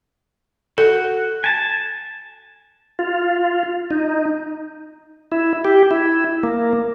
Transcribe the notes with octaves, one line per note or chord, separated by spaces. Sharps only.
F#4 A4
G#5 A5
F4
D#4
E4
G4
E4
A#3